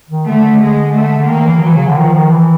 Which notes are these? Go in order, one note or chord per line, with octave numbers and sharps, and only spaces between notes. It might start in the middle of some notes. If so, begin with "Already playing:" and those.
D#3
D3 A3
G#3
A3
D3
D#3 A#3
E3
E3 F#3
C#3
D3
D#3 F3
D#3
E3